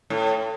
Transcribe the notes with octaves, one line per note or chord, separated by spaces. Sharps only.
A2